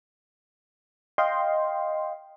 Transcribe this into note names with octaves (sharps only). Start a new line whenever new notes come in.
D#5 F5 G5 C6